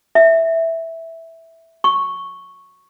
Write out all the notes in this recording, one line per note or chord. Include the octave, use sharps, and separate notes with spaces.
E5
C#6